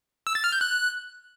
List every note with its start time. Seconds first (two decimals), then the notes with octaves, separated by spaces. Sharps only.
0.27 E6
0.35 A6
0.44 F6
0.52 G6
0.61 F#6